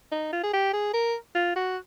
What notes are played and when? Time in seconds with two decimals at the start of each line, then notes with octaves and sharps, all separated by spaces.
0.12 D#4
0.33 F4
0.43 G#4
0.53 G4
0.73 G#4
0.94 A#4
1.35 F4
1.56 F#4